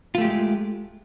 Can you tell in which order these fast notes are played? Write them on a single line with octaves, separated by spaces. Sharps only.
F4 A3 G4 G#3